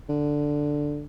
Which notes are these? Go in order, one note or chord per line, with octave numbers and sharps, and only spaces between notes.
D3